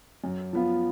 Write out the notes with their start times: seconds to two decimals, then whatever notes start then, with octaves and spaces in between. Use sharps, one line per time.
0.24 F#2
0.53 F3 B3 F4